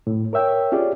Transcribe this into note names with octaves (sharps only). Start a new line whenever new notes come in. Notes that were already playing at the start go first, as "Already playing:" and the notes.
A2
A#4 C#5 E5 G5
C#4 F4 G4 G#4 D5